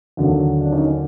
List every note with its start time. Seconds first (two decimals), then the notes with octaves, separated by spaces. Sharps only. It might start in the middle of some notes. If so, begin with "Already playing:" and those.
0.17 D#2 D3 F#3
0.61 D4
0.72 C#4 D#4